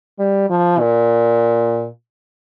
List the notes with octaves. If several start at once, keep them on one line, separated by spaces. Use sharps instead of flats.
G3
F3
A#2